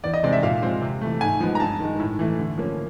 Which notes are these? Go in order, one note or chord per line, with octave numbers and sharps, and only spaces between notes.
E2 D5
D#5
C3 D#3 G#3 C4 D5
E5
A#2 F5
F3 G#3 C4
C3
E3 A3
G#2 G#5
F3 G#3 B3
A#5
G2 A5
D#3 G#3
A2
E3 A3
D3
F3 A#3 C#4